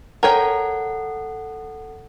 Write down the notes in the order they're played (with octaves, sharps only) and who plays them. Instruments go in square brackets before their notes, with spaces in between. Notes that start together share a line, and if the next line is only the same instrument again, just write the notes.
[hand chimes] A4 F#5 [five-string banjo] A#4 C#5 G5